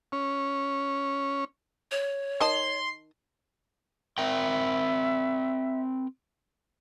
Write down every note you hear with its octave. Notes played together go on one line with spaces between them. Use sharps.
C#4
C#5
D#3 D#5 A5 C6
C4 A#4 E5 G5